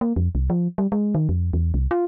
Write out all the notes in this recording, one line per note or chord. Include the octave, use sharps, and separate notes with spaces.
A#3
F2
C2
F3
G3
G#3
D#3
F2
E2
C2
F4